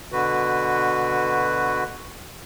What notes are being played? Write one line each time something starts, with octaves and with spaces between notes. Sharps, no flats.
B2 D3 F#4 B4